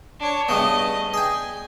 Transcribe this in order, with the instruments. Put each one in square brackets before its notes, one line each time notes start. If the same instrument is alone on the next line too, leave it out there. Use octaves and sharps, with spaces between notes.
[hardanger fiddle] D4 C#5
[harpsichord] G2 C#3 B3 [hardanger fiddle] A3 D#5
[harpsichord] G#4 G5 [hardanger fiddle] G#5